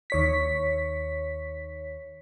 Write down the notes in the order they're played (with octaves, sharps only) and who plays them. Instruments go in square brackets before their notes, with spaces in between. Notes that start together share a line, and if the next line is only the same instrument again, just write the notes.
[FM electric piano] D#2 C#5 B6